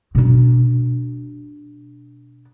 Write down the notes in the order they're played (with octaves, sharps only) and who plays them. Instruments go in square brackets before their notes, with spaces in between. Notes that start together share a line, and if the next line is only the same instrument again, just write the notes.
[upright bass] B2 D4